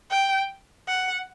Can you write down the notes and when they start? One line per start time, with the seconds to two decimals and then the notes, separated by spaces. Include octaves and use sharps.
0.11 G5
0.88 F#5